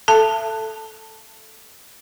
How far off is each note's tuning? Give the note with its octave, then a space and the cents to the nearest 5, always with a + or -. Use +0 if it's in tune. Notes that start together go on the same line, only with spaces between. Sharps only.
A4 +0 E5 +35 A5 +10